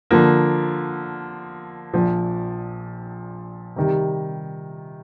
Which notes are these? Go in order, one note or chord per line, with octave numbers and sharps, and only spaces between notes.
D3 F3 A#3
A#1 A#2 F3
C3 D#3 G3